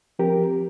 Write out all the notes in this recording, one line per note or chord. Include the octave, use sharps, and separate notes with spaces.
F3 C4 G4 A#4